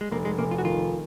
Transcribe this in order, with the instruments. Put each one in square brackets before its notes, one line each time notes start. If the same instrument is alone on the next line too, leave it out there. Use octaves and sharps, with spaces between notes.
[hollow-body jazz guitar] G#3
[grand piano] F1 [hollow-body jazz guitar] A#3
[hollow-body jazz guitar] G#3
[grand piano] F1 [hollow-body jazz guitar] A#3
[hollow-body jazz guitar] F4
F#4
[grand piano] D#3 [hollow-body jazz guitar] F4